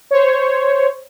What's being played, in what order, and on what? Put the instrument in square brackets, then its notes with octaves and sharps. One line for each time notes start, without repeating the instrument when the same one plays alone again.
[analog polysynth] C5 C#5